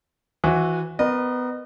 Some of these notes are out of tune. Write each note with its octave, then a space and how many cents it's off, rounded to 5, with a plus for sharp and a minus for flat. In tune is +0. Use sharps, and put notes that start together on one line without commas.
E3 +0 F#4 -20 C5 +35
B3 +25 A#4 +25 D#5 -30